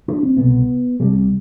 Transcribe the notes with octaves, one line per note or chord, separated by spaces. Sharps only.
D4
C4
C2 B2 B3
C2 C3 G3